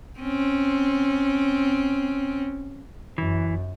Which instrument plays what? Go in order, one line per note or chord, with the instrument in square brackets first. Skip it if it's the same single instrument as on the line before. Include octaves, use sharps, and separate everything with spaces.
[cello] C4 C#4
[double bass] F#2 [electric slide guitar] E3